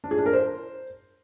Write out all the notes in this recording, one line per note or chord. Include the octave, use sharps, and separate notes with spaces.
D4
G#4
D4
A#4
C5